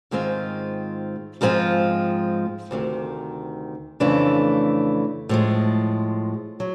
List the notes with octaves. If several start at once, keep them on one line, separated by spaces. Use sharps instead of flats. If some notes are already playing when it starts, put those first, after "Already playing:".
G#2 D#3 G#3 C4 F4
G#2 F3 G#3 C4 F4
D2 C3 D#3
F2 C#3 E3 A3 D4
A2 F3 G#3
F#3